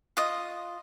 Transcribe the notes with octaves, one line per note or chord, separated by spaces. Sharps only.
F4 D#5